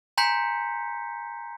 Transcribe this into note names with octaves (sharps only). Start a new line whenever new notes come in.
G#5 A#5 C6 G6 B6 C#7